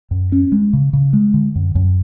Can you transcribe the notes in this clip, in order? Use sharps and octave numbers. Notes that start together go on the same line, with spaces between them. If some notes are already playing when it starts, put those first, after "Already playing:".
F#2
C#4
G#3
C#3
C#3
G#3
D3
F#2
F#2